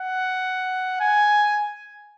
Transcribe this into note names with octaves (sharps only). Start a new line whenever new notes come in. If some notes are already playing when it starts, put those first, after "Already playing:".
Already playing: F#5
G#5